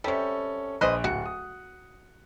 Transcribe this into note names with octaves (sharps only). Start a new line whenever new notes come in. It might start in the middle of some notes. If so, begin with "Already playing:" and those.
C3 G3 C#4 A4
A#1 B4 C5 D#5 F#6
D1 F#4 C#7
D#6